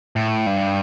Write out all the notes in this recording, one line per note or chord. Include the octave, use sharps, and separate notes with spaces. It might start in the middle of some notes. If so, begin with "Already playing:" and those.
A2
G2